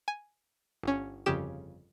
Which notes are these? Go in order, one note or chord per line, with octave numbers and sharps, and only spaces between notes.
G#5
G1 C#4
G1 F2 C#3 G4 E7